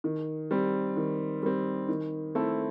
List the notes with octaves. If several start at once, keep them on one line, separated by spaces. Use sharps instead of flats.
D#3
G3 C4
D#3
G3 C4
D#3
A3 C4 E4 A4